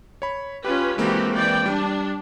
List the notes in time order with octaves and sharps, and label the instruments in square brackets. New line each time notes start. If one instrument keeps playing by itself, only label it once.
[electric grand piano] C#5 B5
[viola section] C#4 F4 B4 [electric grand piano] G4
[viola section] E3 F#4 G4 [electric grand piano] G#3 A#3 C4
[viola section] E3 D5 G5
[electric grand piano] G3 [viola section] D4